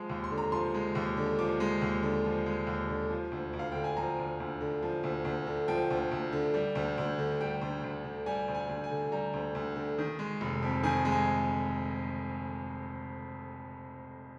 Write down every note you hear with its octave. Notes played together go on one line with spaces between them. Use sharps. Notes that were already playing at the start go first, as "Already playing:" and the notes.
Already playing: F3 G#3
D#2
C6
D3
A#5
F3 C6
G#3
D#2
D3
F3 D6
G#3
D#2
D3
F3
G#3
D#2
D3
F3
D2
D2
F5
D3 G5
G#5
F3 A#5
D2
D2
D3
F3
D2
D2
D3
F3 G5
D2
D2
D3
G3
D2
D2
D3
G3 G5
D2
D2
D3
G3 G#5
D2
G#5
D2
G#5
D3
G3 A#5
D2
D2
D3
D#3
G#3
F1
F2
D#3 G#5
G#3
G#5